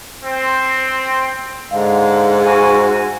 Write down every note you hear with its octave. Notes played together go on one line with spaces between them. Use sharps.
C4
G#2 D3 G#3 F5
F#4 G#5